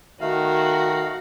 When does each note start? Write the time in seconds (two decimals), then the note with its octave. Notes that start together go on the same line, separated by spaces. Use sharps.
0.21 D#3 A3 F#4 F5